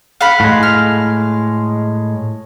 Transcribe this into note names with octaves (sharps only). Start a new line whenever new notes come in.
F5 F#5 B5
A2 G#3
F6